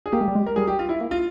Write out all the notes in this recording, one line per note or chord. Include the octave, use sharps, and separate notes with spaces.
G#4
A#3 G4
G#3
G3
G#3
A#4
G3 G#4
G4
F4
E4
A#3
F4